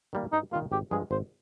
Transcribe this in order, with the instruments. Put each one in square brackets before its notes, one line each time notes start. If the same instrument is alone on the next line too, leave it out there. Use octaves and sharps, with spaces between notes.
[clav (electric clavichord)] D#3 G3 A#3
[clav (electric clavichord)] G2 [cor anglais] D#4
[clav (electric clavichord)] D#3 G3 A#3 [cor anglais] F4
[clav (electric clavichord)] G#1 [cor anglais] G4
[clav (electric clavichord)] G2 F3 G#3 [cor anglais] G#4
[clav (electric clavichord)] G#1 [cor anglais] C5